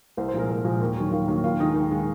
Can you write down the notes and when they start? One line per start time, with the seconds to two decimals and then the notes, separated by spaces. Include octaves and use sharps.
0.17 C2 C5
0.28 C5
0.33 A#2 F3 G#3 A#4
0.49 C2
0.64 A#2 F3 G#3
0.81 D#2
0.97 D#3 F#3
1.12 D#2 F4
1.28 D#3 F#3 A#3
1.44 D#2 F4
1.60 D#3 G#3 D#4
1.76 D#2
1.91 D#3 G#3